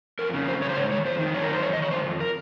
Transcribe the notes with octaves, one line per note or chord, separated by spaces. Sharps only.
F2 A#4
C#3
F2 C5
C#3 C#5
C5
G#2 C#5
D#3 C#5
F2 C5
D#3
F#2 C#5
A#4
D#3 C5
F2 C#5
D#5
D#3
C#5
D#3 C5
F2
A#4